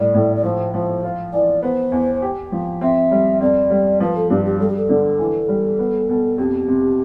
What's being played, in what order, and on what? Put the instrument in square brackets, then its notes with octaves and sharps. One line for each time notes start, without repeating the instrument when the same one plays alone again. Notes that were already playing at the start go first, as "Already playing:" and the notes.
Already playing: [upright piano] A2 G3 [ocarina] D5
[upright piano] A2
[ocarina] D5
[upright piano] F3 [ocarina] C5
[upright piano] F3 [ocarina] C5
[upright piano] F4
[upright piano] E3 [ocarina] D5
[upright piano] B3 [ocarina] C5
[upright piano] E2
G4
F3
[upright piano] C4 [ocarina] E5
[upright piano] G3
[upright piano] F2 [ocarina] D5
[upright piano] G3
[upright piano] F3 [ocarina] B4
[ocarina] A4
[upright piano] G2 [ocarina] G4
[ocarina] G4
[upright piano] G3 [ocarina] A4
[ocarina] G4
A4
[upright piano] D3
E3
G3
B3
B2
[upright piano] F2 [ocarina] G4
[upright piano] C3